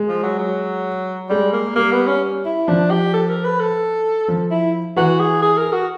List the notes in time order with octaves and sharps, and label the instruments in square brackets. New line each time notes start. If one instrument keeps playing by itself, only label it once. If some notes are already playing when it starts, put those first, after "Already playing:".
Already playing: [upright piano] G#3
[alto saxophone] F3
F#3
F#3
[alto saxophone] G3 [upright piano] G#3
[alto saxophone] A#3
[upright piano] G3 [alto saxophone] A#3
[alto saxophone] B3
C#4
E4
[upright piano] F3 [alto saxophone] D4
[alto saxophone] G4
A4
A#4
B4
A4
[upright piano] F3
[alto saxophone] E4
[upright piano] E3 [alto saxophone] F#4
[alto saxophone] G#4
G#4
A#4
F#4